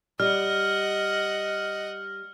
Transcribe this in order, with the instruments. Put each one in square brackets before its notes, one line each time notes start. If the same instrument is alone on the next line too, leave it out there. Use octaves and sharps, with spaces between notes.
[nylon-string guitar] G3 [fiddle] D#5 F#5 [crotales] F6